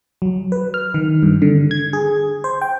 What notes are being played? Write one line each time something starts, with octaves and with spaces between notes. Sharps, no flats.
F#3
B4
F6
D#3
G2
D3
G#6
G#4
C5
G5